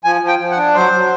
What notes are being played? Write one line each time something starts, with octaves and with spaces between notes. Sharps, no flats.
F3 G#5
F3
G5
F3
F#5
D4
F#3 C5
F#3